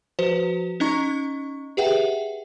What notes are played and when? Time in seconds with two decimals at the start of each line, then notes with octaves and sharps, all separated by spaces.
0.19 F3 F#4 B4 C5
0.80 C#4 D#4 D#5 A#5 C#6
1.77 G4 G#4 B4 E5 F#5 G5